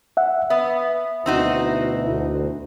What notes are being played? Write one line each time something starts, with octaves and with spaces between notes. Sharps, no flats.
E5 F#5
B3 E5
D2 B2 C4 D#4 E4 F#4
D2